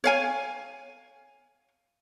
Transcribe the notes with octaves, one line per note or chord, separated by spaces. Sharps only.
C#5 F5 G#5